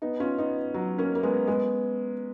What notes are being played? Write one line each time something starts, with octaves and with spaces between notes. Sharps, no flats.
B3 D#4
C#4 F4
B3 D#4
F#3
A#3 C#4
A#3
G#3 B3
G#3 B3